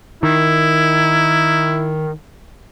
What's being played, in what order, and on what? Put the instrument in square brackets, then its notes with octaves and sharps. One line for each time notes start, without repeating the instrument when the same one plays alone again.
[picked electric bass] D#3 [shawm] E4